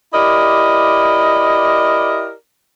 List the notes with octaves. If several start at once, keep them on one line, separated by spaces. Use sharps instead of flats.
E4 G4 A#4 D5 D#5